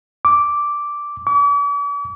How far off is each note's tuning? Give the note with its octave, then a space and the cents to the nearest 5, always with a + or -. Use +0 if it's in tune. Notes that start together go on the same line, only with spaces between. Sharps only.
D6 -5
D6 -45